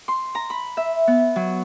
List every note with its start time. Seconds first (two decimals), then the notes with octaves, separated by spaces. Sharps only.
0.08 C6
0.35 A#5
0.50 B5
0.77 E5
1.07 B3
1.36 F#3